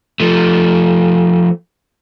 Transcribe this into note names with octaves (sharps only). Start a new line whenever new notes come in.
F3 A3